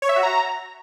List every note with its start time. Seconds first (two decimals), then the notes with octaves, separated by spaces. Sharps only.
0.02 C#5
0.09 E5
0.16 F#4
0.23 A#5